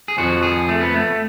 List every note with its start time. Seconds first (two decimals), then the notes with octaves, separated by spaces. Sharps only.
0.08 G#4
0.18 F2 F3 F#4
0.43 G#4
0.69 A3
0.81 B3
0.94 A3